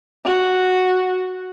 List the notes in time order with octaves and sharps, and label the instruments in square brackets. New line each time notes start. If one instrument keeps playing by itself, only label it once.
[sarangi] F#4